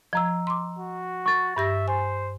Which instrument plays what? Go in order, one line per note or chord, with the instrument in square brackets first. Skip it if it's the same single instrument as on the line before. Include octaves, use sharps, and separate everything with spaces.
[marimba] F3 G#6 [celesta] D#5 A#5 E6
[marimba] C6 D6
[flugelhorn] F#4
[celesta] C#6 A6
[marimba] G2 G4 A#6 [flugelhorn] E5
[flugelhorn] C5 [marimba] G#5